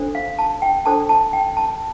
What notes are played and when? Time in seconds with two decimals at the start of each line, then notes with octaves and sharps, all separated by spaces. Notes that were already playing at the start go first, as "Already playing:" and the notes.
Already playing: D4 A4 C5
0.15 F5
0.39 A5
0.62 G5
0.86 D4 A4 C5 A5
1.09 A5
1.33 G5
1.57 A5